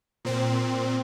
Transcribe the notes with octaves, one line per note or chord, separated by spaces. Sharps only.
A#2 C4